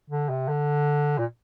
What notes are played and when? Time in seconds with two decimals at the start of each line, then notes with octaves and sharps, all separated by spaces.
0.10 D3
0.30 C3
0.48 D3
1.19 A#2